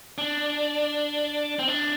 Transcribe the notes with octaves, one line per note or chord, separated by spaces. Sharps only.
D4
C4
D4